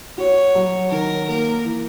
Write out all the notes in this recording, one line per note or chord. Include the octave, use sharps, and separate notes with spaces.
F#4 C#5
F#3
D#3 A#4
A#3 A#4
E3